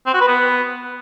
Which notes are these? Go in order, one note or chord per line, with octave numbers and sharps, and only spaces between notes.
C4
F#4
B4
B3